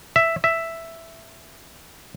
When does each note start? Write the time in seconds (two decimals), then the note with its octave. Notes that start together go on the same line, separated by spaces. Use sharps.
0.16 E5
0.44 E5